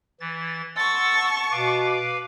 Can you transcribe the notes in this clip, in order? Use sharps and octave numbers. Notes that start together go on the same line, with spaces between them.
E3 A6
F#5 A5 C6 C#6 E6 A6
B2 B4 F5 D6
D6